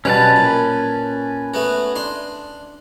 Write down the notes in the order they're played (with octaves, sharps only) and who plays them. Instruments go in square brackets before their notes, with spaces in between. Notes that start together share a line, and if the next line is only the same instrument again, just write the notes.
[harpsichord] B2 F#3 G3 [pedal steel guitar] C#4 B4 A5
[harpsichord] A#2
A3 B3 F#4
D4 C6